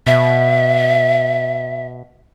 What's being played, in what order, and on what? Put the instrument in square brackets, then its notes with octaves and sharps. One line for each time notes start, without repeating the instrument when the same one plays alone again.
[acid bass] B2 [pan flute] E5